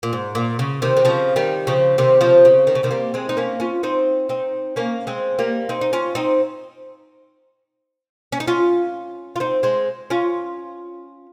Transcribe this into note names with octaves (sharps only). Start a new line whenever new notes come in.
A#2
G#2
A#2
C#3
C3 D#3
D#3
C#3 F3
D#3 G3
C#3 F3
C3 D#3
C#3 F3
C#3
D#3
C#3
C3 D#3
G3 A#3
G#3 C4
D#4
A#3 C#4
C#4 F4
C4 D#4
C4 D#4
A#3 C#4
G#3 C4
G3 A#3
C4 D#4
D#4
C#4 F4
C4 D#4
C#4
D#4
C#4 F4
F4
C4 D#4
G#3 C4
C#4 F4